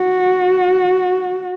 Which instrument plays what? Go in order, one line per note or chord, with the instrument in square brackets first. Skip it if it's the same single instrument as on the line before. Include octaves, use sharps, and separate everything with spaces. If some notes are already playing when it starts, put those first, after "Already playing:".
Already playing: [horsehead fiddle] F#4